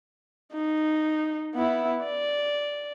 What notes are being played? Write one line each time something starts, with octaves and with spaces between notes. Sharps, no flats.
D#4
B3 E4
D5